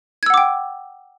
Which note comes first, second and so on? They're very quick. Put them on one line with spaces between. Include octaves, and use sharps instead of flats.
G#6 E6 F#5 D6 G5